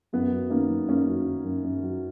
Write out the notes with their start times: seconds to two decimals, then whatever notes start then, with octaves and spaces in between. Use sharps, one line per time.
0.13 F#2 B3
0.32 F#3
0.50 D#3 A#3 C#4
0.70 F#2
0.88 F#2 A#3 C#4
1.08 F#3
1.27 D#3
1.45 F#2
1.64 F#2
1.83 F#3